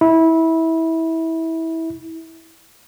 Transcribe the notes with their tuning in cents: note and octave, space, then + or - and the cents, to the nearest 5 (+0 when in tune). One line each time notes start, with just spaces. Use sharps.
E4 -20